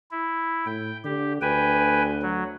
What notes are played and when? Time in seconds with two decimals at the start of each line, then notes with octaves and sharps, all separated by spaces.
0.11 E4
0.66 A2 G5
1.05 D3 G4
1.42 D2 B4 G5 G#5
2.22 F#3